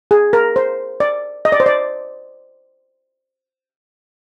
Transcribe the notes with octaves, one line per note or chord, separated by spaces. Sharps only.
G#4
A#4
C5
D5
D#5
D5
C5
D5